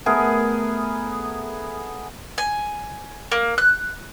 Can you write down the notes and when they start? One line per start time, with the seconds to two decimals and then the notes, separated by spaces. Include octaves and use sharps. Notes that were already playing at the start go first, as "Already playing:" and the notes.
0.06 A3 B3 G#4 A#4
2.38 G#5
3.32 A#3
3.58 F#6